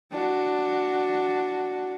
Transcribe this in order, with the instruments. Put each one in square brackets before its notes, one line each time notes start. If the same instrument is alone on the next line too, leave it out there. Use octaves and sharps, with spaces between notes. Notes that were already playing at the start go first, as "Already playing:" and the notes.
[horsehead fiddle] D4 F#4